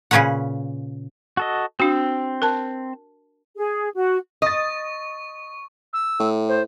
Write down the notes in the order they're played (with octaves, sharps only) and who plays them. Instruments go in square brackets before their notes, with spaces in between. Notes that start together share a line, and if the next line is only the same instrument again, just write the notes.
[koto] A#2 C#3 C#4 B4 C#5 F#5
[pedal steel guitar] F#4 A4 D#5
[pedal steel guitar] C4 E6 [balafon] D4 F#4
[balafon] A#4 A5
[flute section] G#4
F#4
[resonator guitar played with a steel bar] D#5 [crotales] C#6 [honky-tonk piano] D#6 A6
[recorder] E6
[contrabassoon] A2
[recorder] C5